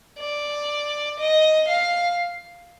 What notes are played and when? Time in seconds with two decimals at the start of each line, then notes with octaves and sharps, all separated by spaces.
0.20 D5
1.19 D#5
1.68 F5